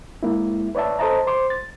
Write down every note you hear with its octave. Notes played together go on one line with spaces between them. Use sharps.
G#3 A#3 E4
B4 C#5 D5 E5 A5
A4 C5 D#5 A5 A#5
C5 C6 D6
A6